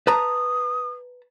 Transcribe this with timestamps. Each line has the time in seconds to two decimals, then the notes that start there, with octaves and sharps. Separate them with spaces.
0.07 B4 A5 A#5 D#6